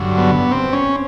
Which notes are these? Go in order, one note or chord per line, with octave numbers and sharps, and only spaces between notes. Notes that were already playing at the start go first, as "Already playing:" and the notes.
Already playing: G2 D3 F#3
B3
C4
C#4